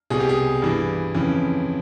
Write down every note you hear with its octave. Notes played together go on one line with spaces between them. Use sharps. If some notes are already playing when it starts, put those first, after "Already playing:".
C2 B2 G#4
G4
G#4
G2 E3
F2 C#3 E3